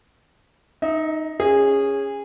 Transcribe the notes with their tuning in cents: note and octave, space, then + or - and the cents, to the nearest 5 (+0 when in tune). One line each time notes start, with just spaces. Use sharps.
D#4 +0 E5 -40
C#4 +0 G#4 -20